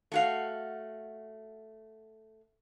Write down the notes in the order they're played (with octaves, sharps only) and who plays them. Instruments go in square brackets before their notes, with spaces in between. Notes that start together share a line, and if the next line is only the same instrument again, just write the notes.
[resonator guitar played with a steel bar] A3 F#4 F5